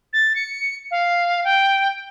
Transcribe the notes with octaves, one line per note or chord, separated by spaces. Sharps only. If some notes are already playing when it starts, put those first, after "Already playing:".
A6
C#7
F5
G5